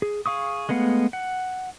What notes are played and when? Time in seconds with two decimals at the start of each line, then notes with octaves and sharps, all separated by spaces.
0.02 G#4
0.26 G#4 F5 C#6 D#6
0.69 G#3 A3 B3 F5 F#5
1.13 F#5